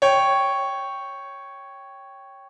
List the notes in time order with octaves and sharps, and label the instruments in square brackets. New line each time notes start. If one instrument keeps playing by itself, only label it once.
[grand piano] C#5 G5